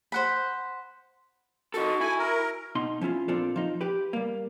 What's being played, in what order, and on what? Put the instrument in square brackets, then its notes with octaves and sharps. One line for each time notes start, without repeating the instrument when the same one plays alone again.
[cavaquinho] C5 F#5 B5
[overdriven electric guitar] D#4 A4 [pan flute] F#4
[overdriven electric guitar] E4 [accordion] G#5
[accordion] A#4
[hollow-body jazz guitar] B2 D#4 C6
F3 C#4 E4 F4
A#2 C4 D4 F4 A4
F3 D#4
G4 B4
G3 A#3